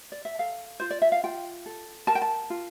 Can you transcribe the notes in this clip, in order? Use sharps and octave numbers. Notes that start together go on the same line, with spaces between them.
D5
E5
A4 F5
F4 C5
D5
E5
F5
F4 G5
A4
A#4 A5
G5
A5
F4